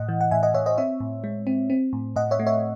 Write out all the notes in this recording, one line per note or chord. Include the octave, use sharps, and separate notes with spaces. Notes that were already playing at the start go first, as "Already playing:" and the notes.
Already playing: A2 D#5 F#5
E3
F#5
A2 E5 G#5
D#5 F#5
A2 C#5 E5
C5 D#5
C4 C#5 E5
A2
G#3
C4
C4
A2
A2 D#5 F#5
C#5 E5
A3
C#5 E5